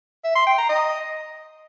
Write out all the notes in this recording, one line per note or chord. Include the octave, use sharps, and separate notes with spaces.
E5
C6
G5
A#5
D#5